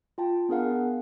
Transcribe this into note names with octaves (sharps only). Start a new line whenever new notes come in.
F4 G5 A5
B3 D4 G#4 A#4 F5 F#5